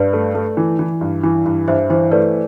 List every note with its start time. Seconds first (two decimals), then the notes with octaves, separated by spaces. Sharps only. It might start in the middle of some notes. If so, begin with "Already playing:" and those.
Already playing: G2 B4 D5
0.13 A3
0.35 A3
0.57 E3
0.79 E3
1.01 G2
1.23 E3
1.46 G2
1.68 G2 C5 E5
1.90 E3 C5
2.11 A3 B4 D5